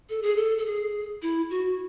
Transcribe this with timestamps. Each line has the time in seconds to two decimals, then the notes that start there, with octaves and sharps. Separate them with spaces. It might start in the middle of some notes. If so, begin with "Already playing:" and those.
0.09 A4
0.22 G#4
0.36 A4
0.58 A4
0.66 G#4
1.22 E4
1.50 F#4